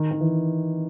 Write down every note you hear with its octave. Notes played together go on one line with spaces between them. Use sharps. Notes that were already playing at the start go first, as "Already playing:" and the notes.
Already playing: D#3
D#3
E3